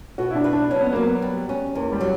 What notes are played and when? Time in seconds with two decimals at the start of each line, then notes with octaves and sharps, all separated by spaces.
0.18 B2 F#4
0.31 E4
0.35 D4
0.44 B4
0.53 D4
0.70 F#3 C#4
0.81 B3
0.93 F#3 A#3
1.04 B3
1.22 G3
1.49 C#4
1.75 E2 A#3
1.92 G3
2.01 F#3